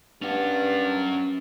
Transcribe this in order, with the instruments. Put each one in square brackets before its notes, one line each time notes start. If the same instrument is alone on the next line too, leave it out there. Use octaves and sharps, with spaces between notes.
[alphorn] G2 [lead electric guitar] C#4 F#5